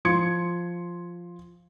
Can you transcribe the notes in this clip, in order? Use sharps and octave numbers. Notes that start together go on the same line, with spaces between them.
F3 C6 G#6 C#7